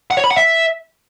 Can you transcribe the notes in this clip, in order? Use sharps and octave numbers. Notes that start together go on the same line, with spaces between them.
F#5
C#5
B5
F#5
E5